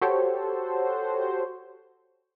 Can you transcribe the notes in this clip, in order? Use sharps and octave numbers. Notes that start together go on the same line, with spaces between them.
F#4 G4 A4 C5 C#5